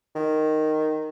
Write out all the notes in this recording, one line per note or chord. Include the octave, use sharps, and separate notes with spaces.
D#3